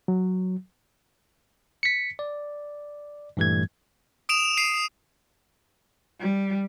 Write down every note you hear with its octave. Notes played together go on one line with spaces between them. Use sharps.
F#3
B6 C#7
D5
G2 A#2 E3 G3 A3 G#6
D#6 D7 E7 F7
C7 D7 D#7
G3